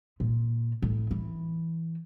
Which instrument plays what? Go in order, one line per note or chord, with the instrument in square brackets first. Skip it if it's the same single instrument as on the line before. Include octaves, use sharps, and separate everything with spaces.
[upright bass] A#2
A2
E3